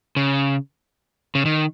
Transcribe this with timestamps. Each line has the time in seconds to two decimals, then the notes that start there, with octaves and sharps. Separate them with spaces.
0.16 C#3
1.35 C#3
1.46 D#3